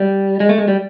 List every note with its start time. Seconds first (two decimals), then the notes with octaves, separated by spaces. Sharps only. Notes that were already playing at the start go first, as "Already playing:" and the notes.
Already playing: G3
0.40 G#3
0.49 A3
0.58 G#3
0.68 G3